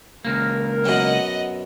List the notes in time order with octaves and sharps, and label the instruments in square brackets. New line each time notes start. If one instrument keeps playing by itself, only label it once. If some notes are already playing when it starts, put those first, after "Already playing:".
[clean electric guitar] C#2 A#3 [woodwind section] A#4
[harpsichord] F#2 B2 [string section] D#5 F#5